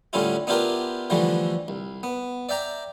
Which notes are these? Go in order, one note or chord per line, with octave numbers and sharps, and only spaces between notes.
A2 D3 G3 C#4 E4 F4
B3 D4 E4 F4 G4 A#4
D3 E3 F3 G3 A3
C2
B3
D5 E5 G5 A#5